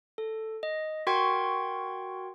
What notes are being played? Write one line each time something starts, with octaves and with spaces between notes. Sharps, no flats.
A4
D#5
F#4 A#4 G5 C6 C#6 G#6